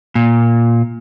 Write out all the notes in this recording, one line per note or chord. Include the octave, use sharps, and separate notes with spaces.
A#2